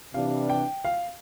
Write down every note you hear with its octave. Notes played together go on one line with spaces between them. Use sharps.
C3 E3 G3 D4 F5
G5
F5